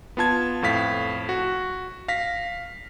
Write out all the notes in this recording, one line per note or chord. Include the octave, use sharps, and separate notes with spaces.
B3 F4 A5 G#6
F2 A2 F5 B6
F#4
F5 A#6 B6